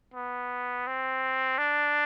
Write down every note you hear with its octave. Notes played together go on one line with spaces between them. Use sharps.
B3
C4
D4